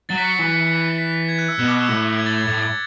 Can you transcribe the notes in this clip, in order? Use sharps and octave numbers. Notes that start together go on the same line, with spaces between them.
F#3 A6
B6
C#7
E3 B6
C#7
B6
B6
B6
G#6
F#6
E6
B2 F#6
D6
E6
A2 F#6
G#6
A6
G#6
A2 A6
A6